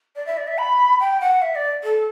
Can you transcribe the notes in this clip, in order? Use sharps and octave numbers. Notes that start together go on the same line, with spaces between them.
D5
E5
D5
E5
B5
G5
F#5
E5
D5
A4